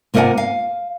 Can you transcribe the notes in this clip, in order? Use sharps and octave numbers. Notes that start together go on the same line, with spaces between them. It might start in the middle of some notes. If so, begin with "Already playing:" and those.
C3 A#3 F4 D#5 F#5 G#5
F5